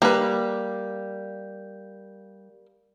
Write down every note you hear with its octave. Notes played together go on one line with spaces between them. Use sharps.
G3 A#3 B4